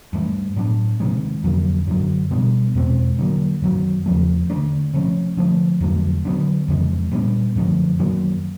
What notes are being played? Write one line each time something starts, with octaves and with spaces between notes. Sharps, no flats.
G2 E3 A3
A2 F#3 B3 D4
C3 D#3 G#3
F2 D3 F#3 A#3
F#2 D3 F#3
B2 G3 B3 D4
E2 B2 G#3 C4
D3 F#3 A#3
F#2 D#3 F#3
E2 C#3 F3 A3
D3 F3 A3 D4
C3 F3 A3 C#4
D3 F3 A3
F2 D3 F#3 A3
D3 F#3 B3
F2 C#3 E3 G#3
A#2 G3 B3 D4
F#2 D3 F3 A3
F#2 D#3 F#3 A#3